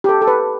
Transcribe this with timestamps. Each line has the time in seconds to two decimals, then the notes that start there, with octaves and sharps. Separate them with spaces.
0.04 G4
0.09 A4
0.22 A4
0.27 B4